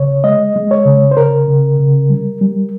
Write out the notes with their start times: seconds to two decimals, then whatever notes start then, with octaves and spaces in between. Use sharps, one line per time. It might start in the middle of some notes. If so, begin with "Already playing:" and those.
Already playing: C#3 C#5
0.24 G#3 D#5
0.56 G#3
0.71 C#5
0.86 C#3
1.11 C5
1.17 C#3 A#4
1.48 C#3
1.79 C#3
2.10 G3
2.41 G3